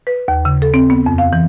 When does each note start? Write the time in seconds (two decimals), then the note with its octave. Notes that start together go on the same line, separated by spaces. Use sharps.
0.07 B4
0.28 D#2
0.45 C#3
0.62 A4
0.74 C4
0.90 B3
1.06 F2
1.18 F5
1.33 E3